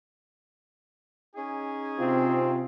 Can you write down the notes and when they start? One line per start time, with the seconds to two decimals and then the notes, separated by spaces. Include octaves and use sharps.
1.36 C#4 D#4 G#4
1.99 C3 C4 F4